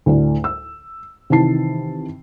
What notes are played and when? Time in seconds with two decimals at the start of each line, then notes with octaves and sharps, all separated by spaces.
0.06 D2 A2 D3
0.44 E6
1.30 C3 D#3 E3 A5 C7